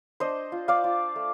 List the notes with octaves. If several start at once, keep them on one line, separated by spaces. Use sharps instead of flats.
D4 C5 D#5
F4
D5 F5
F4
A3